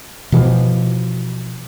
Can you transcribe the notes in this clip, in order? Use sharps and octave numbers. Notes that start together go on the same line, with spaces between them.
B2 E3 F3